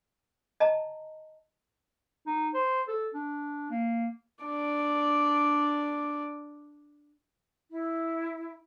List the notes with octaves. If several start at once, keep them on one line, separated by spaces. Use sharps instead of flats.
D#5 A5 A#5
D#4
C5
A4
D4
A#3
D4 D5
E4